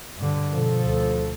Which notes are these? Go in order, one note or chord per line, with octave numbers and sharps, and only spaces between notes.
G2 D3
B2 F3 A4
D2